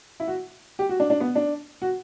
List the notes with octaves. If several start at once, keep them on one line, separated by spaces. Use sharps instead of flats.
E4
F#4
G4
F#4
D4
D4
B3
D4
F#4